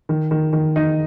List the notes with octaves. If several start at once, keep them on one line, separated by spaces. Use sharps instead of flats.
D#3
D#3
D#3
D#4